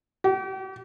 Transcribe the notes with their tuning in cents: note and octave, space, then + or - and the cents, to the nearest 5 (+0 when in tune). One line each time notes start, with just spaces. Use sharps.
G4 -40